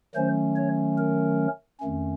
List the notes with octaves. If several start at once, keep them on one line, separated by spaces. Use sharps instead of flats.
D#3 F#3 A3 C#4 C5
C#5
A#4
F2 D#3 A3 C#4